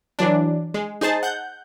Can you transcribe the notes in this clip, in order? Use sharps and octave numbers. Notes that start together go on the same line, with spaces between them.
E3 F#3 D4
G#3
D#4 G#4 C5 A5
F#5 G6